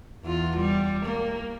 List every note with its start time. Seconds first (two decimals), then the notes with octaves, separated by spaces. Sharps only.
0.23 E2 F4
0.57 G3
1.05 A#3